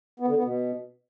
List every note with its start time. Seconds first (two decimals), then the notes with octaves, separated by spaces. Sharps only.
0.20 B3
0.28 D3
0.36 B3
0.44 B2